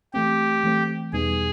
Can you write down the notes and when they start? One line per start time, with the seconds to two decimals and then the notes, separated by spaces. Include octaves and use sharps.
0.14 E3 A3 C4 G4
0.64 E3 A3 C4
1.13 E2 B2 G3 B3 D#4 G#4